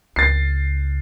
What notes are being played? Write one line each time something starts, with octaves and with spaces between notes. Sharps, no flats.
C#2 A6 C7